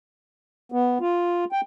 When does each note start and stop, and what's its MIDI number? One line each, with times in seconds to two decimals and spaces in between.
0.72 0.98 59
1.01 1.45 65
1.52 1.61 79